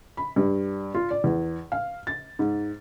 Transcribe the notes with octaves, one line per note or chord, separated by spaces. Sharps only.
B5
G2
F4
D5
E2
F5
A6
G#2